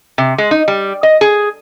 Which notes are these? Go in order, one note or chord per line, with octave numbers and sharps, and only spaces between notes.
C3
G#3
D#4
G3
D#5
G#4